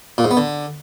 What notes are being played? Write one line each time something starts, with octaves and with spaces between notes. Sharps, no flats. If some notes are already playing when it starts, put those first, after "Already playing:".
A#2
G#2
B3
D3